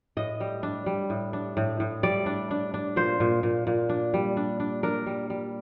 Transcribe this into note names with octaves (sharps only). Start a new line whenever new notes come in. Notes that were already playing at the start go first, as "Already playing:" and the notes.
A2 D#5
G3
D4
G3
A2
D4
A2
A2
G3 D5
D4
D4
D4
A#2 C5
A#2
A#2
A#2
D4
G3
D4
D4
D4 A#4
G3
G3